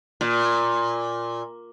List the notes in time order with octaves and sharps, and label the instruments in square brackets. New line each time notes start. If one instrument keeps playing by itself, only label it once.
[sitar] A#2